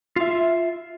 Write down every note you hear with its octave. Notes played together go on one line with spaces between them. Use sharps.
F4 E5